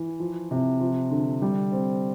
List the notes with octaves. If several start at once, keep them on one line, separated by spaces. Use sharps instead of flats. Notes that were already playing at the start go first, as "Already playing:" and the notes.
Already playing: E3
F3
C3
F3
D3
G3
C4